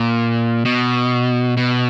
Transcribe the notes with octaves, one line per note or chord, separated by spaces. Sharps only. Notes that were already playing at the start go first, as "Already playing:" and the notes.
Already playing: A#2
B2
B2